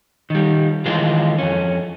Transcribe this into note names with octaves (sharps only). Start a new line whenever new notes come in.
D#3 G3
D#3 E3 G#3 F4
F2 C#4